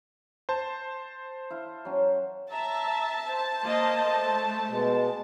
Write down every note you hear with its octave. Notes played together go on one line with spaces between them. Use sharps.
C5 A5
E4 F5
F#3 C#4
E5 A5 A#5
C5
A#3 D#5
A3
B2 G#3